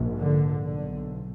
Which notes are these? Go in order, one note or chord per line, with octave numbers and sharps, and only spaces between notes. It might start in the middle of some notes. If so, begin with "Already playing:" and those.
Already playing: A#1 G#2
D3
B1 B2 D3